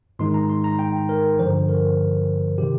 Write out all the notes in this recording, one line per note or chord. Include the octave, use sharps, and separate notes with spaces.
G#2 D#3 G#3 D#4 C6
A#5
C6
A#5
G5
A#4
G2 D3 F3 C5
A#4
C3 D#3 G4